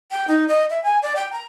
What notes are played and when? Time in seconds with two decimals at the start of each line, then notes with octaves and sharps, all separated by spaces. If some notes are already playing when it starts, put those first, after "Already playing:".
0.11 G5
0.28 D#4
0.48 D#5
0.70 E5
0.83 G#5
1.02 D5
1.16 G5
1.33 A#5